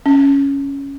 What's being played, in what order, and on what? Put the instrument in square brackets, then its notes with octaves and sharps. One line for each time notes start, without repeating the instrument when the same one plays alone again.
[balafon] C#4